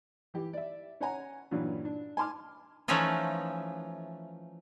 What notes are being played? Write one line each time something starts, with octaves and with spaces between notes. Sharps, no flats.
E3 G4
D5 E5
C#4 C#5 F#5 G#5 A#5
G2 A#2 E3 F#3 C#4
D4
G#5 A5 C6 D6 F6
E3 F3 A3 C#4 D#4 F4